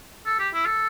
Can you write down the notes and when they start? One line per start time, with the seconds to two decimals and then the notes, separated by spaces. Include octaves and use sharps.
0.26 A4
0.39 G4
0.54 E4
0.66 A4